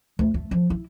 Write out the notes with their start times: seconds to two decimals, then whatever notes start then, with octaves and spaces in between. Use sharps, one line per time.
0.19 D2
0.34 A3
0.51 F3
0.70 E4